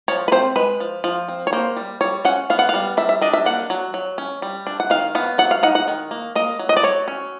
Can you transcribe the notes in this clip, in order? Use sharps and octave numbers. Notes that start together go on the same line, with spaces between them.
F3 C#5
B4
C4 C5
G#3 B4
F3
F3
C4
C#5
A#3 C5
G3
G3 C#5
C#4 F#5
B3 F5
F#5
F5
G3
G3 E5
E5
D4 D#5
E5
A#3 F#5
F#3
F#3
C#4
G3
D4
F#5
D#3 F5
B3 F5
F#3 F#5
F5
D#4 F#5
F#5
D#3
A#3
A#3 D#5
F#3
D#5
D5
F#3 C#5
C#4